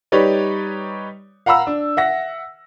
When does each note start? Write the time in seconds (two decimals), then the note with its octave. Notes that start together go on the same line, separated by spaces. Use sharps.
0.12 G3 D#4 G4 B4 C#5 D5
1.46 F5 F#5 A#5 B5 E6
1.67 D4
1.97 E5 F#5 A#6